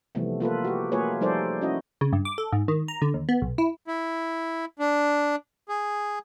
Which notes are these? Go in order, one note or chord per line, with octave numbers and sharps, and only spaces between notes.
C3 E3 F3 G3 A3 B3
A#3 F4 A4 B4
F#4 G4
A3 A#3 F4 G#4 B4 C#5
F3 G3 D#4 A4 C5 D5
C#4 E4 F#4 D#5
C#3
G2
D6
A4
G#2
D#3
A#5
D3
D#2
B3
B1
E4
E4
D4
G#4